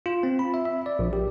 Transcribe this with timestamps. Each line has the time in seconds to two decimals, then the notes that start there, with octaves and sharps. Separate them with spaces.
0.06 F4
0.23 C4
0.39 B5
0.54 E5
0.65 E5
0.86 D5
0.99 A#1
1.13 G4